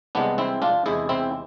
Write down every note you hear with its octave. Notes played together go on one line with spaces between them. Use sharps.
C2 C3 E3 G#3 B3 D4
C4 E4
D4 F4
E2 C3 G#3 E4 G#4
C4 E4